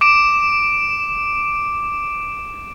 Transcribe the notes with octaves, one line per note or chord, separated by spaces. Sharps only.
D6 D7 E7